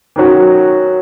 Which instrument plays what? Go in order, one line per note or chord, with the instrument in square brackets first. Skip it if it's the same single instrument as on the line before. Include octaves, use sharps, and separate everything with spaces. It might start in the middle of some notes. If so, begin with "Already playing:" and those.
[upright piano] D#3 F#3 C#4 F#4